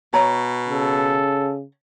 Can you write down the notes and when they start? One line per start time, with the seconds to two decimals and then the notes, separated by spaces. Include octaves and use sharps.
0.14 B2 C#5 A#5
0.69 C#3 A4